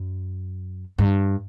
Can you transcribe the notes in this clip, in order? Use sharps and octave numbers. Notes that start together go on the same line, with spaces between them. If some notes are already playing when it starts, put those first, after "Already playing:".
Already playing: F#2
G2